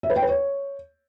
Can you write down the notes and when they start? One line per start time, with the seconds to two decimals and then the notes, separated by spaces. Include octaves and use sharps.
0.03 E5
0.10 B4
0.16 G5
0.22 B4
0.29 C#5